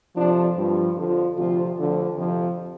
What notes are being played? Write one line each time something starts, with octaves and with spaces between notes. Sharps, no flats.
F2 C3 F3 D4
G2 F3
F2 D3 F3
D2 C3 F3 F4
D2 D3 F3
F2 C3 F3